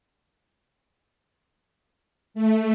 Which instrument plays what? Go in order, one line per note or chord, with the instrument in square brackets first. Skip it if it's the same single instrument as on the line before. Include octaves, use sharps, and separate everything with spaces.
[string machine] A3